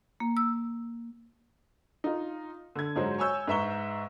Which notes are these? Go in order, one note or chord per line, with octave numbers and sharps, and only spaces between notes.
A#3
E6
D#4 F4
D3 G#6
G#2 F#3 G#3 C5
C#5 G#5 C#6 E6 G6
G#2 B4 E5 A#5 C#6 G7